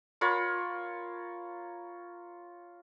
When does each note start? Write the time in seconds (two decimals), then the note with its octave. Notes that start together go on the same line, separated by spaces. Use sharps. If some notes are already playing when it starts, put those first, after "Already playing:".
0.21 F4 A#4 C#5 B5